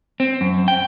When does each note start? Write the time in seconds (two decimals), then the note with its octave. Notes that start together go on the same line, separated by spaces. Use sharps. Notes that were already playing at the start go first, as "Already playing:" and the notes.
0.20 C4
0.41 F#2
0.68 G5